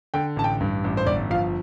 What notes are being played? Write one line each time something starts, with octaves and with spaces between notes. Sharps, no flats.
D3 G5
A1 A5
G5
G2
A1
C5
G1 D5
F3 F5